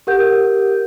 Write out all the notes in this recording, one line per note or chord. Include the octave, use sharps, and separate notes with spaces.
G4 A#4 F#5 G6